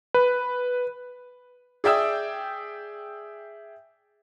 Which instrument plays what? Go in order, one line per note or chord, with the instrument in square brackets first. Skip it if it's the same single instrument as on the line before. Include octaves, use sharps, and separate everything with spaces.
[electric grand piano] B4
[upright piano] G#4 D5 E5 G5 D#6 E6